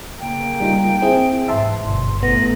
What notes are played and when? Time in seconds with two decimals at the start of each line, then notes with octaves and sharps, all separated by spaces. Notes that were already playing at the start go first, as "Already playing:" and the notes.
0.20 C#3 A#3 G5
0.60 G3 D#4 F4
1.02 C4 E4 G#4
1.48 G#2 E3 E5 A5 C6
1.85 G1 B2 C6
2.23 A1 B3 A#6